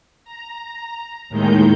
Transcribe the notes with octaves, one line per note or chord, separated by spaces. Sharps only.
A#5
D#2 A2 D#3 G#3 D#4 G6